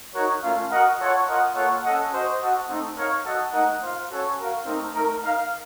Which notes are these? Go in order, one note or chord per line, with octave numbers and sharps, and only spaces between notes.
D#4 F#4 A#4 C#5
A3 C#4 F4 A#4 F5
F#4 A#4 D#5 F#5
F4 A4 C#5 F#5
F4 A#4 D#5 F#5
A#3 F4 A4 C#5 F#5
C#4 A4 D#5 F#5
F#4 C5 D#5
F#4 A4 D#5 F#5
A3 C4 D#4 A4
D#4 A#4 C#5 F5
F#4 A4 D#5 F#5
A3 D#4 A#4 D#5 F#5
F4 C5 F5
C#4 F#4 A4 C#5
F#4 A#4 F5
A3 C4 D#4 A#4
A3 D#4 A#4
D#4 A#4 F5